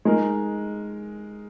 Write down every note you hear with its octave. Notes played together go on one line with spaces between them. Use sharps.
G#3 D#4 A#4